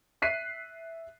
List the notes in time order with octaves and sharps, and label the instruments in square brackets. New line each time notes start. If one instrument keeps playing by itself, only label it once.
[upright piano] E5 F#6 B6 C7 D#7